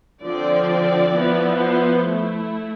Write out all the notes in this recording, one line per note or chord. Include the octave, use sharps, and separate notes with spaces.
D3 F3 C4 D5
F3 B3 E4
C5
A3 E4